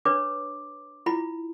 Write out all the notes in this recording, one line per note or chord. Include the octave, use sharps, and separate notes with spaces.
D4 B4 C#5 D6
E4 F4 B5